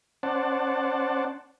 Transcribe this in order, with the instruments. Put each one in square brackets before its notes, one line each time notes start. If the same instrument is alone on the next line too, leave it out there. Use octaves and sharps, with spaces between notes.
[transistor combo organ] C#4 C5 D5 F#5 A5